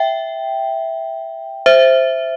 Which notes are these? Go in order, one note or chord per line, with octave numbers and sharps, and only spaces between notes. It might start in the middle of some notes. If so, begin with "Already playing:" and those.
Already playing: E5 G5
C5 E5